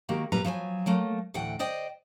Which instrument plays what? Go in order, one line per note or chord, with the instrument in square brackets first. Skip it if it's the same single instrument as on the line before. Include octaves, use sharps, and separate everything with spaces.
[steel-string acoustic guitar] D#3 A#3 F#4 G4 A#5
G2 A#2 G3 B4 A#5
F3 F#3 C5 G#5
F#3 A3 A#3
D2 A2 E3 F#5 G5
C5 D5 D#5 G5